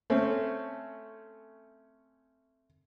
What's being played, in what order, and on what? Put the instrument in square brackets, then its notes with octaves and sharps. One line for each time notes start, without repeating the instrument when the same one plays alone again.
[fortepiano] A3 C4 C#4